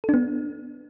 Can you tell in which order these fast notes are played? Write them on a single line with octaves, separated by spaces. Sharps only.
A4 D4 B3